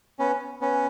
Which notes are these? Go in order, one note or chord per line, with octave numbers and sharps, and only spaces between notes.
B3 C#4
B3 C#4